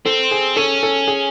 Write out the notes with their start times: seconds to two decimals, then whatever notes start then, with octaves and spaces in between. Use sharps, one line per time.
0.05 C4 A4
0.31 G#4
0.57 C#4 A4
0.83 A4
1.07 G#4